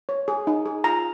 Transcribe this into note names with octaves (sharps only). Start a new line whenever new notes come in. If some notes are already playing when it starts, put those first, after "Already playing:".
C#5
G#4
D#4
G#4
F4 A#5